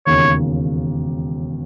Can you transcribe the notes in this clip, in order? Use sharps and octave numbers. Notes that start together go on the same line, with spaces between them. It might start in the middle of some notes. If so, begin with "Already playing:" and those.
E1 D#2 C#3 C#5